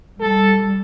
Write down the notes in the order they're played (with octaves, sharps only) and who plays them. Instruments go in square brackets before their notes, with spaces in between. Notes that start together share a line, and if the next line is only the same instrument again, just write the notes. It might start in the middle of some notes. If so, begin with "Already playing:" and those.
[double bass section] G3 [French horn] A4